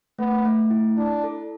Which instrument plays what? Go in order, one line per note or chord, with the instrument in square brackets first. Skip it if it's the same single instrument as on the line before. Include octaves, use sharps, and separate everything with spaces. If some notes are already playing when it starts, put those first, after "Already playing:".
[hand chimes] A3 [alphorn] B3
[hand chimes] A3
E4
[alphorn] D4 [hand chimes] E4
[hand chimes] A4